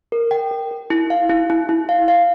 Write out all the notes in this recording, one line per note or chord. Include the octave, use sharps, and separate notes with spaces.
A#4
G5
A#4
A#4
E4
F5
E4
E4
E4
F5
F5